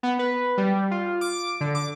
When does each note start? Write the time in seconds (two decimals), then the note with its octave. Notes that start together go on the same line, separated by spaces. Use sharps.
0.03 B3
0.19 B4
0.58 G3
0.91 F4
1.21 D6
1.61 D3
1.75 D6